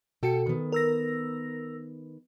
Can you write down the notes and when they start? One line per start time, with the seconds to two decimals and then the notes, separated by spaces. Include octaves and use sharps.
0.23 B2 F#4 A4 G5 A5 C#7
0.47 D#3 B3
0.72 A#4 E6 A#6